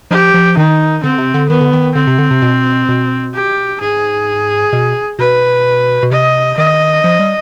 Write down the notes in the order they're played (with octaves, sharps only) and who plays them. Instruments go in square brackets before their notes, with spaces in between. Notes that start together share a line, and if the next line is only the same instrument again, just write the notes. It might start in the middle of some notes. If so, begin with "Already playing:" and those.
[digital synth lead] F3 [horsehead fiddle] G4
[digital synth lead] F3
[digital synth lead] D#3 [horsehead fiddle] D#4
[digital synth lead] D3 [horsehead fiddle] C4
[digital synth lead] C3
D3
[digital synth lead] D#3 [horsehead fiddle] B3
[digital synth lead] D3
D#3
[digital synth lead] D3 [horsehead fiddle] C4
[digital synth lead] C3
D3
C3
B2
B2
[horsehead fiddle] G4
[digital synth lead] G#2 [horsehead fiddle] G#4
[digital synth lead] B2
[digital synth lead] B2 [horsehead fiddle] B4
[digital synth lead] B2
[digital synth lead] C3 [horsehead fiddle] D#5
[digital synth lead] D#3 [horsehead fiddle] D#5
[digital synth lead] F3
G3